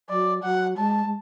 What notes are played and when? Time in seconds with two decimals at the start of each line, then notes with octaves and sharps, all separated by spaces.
0.09 F#3 D5
0.43 F#3 F#5
0.77 G#3 A5
1.06 G#3